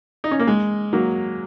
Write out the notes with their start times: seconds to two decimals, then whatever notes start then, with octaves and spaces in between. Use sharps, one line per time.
0.24 D#4
0.31 C#4
0.39 A#3
0.47 G#3
0.93 F#3 A#3